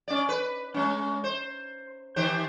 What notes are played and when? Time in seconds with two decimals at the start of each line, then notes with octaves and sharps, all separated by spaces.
0.08 C#4 D5
0.29 B4
0.74 G#3 C#4
1.24 C5
2.16 D#3 G4 C5